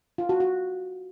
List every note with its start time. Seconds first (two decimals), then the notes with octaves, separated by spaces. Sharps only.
0.18 F4
0.29 F#4
0.40 F#4